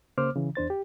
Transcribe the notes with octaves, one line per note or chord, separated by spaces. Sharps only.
C#3 A#3 C5 D6 F6
C#3 E3
E2 D4 C5 A6
G4